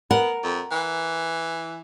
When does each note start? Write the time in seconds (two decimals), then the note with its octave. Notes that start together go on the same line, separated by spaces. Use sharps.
0.11 B3 A#4 F#5
0.44 F2
0.71 E3